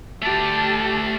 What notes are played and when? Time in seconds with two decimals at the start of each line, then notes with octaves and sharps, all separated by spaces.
0.22 A3 G4 D5 A5